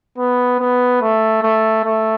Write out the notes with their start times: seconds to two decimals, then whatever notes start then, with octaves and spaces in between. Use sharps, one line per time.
0.18 B3
0.60 B3
1.01 A3
1.43 A3
1.85 A3